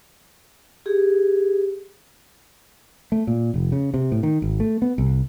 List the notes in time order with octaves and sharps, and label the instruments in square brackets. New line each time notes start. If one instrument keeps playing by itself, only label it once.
[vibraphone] G4 G#4
[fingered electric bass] A3
A#2
F1
C#3
C3
A2
D#3
G#1
A3
B3
C2